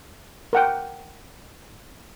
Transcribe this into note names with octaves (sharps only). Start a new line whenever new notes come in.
A#4 F#5 G5